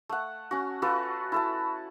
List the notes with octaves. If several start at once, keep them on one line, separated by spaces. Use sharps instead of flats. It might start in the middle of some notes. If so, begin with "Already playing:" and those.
A3 F#5
C#4 F#4
F4 F#4 A4 B4
E4 A4 A5